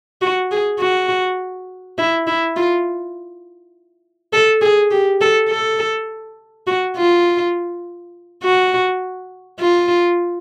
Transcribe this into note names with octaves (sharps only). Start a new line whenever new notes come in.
F#4
G#4
F#4
E4
E4
F4
A4
G#4
G4
A4
A4
F#4
F4
F#4
F4